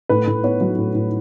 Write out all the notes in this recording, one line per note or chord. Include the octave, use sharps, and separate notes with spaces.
A2 B4
A2
B3 C#5
F#3
A2
A2